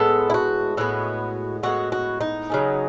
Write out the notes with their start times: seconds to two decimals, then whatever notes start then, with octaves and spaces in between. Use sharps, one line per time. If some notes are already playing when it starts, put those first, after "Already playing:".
Already playing: A2 G#3 B3 A4
0.30 E4
0.34 F#4
0.77 A2 G#3 B3 F#4
1.63 A2 G#3 B3 F#4
1.92 F#4
2.21 D#4
2.50 C#3 F#3 A3 C#4